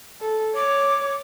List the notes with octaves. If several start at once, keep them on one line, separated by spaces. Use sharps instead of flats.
A4
C#5 D6